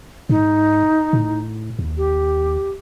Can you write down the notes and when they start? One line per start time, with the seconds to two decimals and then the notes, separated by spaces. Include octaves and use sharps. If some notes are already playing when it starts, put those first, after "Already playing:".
0.29 G#2 D#4
1.13 A2
1.79 D#2
1.97 G4